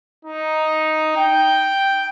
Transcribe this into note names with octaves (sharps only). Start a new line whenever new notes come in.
D#4
G5